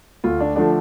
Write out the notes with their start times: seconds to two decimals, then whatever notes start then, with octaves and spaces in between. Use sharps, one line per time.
0.24 D2 F4
0.40 D4
0.56 D3 F3 A3 D4